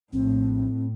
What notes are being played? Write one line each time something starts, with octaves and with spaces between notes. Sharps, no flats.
A#1 A2 C4